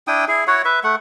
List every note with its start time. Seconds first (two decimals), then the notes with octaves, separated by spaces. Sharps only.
0.07 D4 E4 G5 D#6
0.28 E4 G#4
0.47 E4 F#4 C#5 F#5
0.65 B4 E5
0.84 A3 F#5